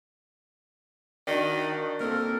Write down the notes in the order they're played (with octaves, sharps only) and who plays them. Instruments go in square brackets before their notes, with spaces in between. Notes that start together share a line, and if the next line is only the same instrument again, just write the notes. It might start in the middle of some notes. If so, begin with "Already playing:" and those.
[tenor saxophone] D#3 [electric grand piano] D4 F#4 D5
[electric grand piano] A#3 C4 A4 [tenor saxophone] A#4